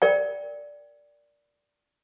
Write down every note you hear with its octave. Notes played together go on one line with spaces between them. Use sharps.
A#4 D5 G5